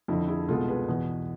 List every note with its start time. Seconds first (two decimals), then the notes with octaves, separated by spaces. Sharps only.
0.08 F2 D3 F3 E4
0.28 E4 G#4
0.48 C2 B2 G#3 B3 F4 A4
0.68 G#4 B4
0.88 E2 B2 B3